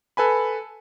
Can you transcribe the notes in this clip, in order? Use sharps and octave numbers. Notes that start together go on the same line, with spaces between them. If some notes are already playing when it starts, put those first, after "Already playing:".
A4 B4 G#5 B5